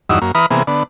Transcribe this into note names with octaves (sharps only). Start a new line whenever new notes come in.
E2 G2 F#3 D#4 E6
F#2 A#3
E3 B4 A#5 B5 D#6 F6
C3 E3 A#3 B3 G#4
D3 B3